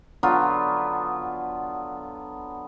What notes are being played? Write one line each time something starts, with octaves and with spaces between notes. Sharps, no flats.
D3 F#3 B3 F4